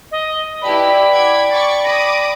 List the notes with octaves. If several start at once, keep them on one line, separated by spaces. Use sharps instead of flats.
D#5
E4 G4 B4 D5 G5 A5 B5
F#5 D6 G#6
C#6 D6 A6
B5 D6 D#6 A#6